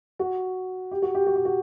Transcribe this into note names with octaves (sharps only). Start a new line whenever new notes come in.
F#4
G4
F#4
G4
F#4
G4
F#4